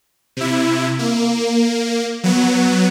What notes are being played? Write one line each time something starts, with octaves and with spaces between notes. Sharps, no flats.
C3 E4
A#3
F#3 B3